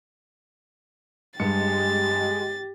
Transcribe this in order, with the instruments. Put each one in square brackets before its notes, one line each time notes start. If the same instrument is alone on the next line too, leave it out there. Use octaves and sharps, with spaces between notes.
[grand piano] G2 C#7 [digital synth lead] G#3 [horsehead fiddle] G4 [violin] A6